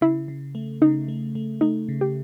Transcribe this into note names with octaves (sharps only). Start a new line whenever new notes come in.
C#3 E4
C#3
A3
C#3 D#4
A3
A3
A3 D#4
C#3
G4